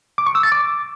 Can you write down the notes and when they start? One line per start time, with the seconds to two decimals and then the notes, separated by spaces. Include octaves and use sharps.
0.18 D6
0.27 C#6
0.35 E6
0.43 A6
0.52 D6